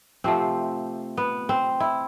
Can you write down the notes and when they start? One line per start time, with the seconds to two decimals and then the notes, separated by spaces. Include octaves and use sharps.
0.24 C3 F3 A3 C4
1.17 B3
1.49 C4
1.80 E4